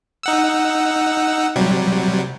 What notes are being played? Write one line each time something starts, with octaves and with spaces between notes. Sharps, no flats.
D#4 F#5 E6
C3 F#3 G3